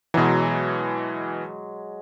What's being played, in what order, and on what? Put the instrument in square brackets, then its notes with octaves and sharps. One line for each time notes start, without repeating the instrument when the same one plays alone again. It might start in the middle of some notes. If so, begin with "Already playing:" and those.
[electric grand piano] B2 E3 [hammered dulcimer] F#3 G#3